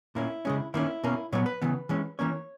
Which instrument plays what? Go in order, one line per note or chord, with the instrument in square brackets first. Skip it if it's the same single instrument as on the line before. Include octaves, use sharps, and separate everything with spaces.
[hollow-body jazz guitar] A#2 A#3 C#4 E4
C#3 G#3 C#4
D#3 A#3 C#4 E4
B2 A#3 C#4
A#2 F#3 B3 C#5
B4
C#3 E3 B3
E3 G#3 C#4
E3 A#3 C#4 C#5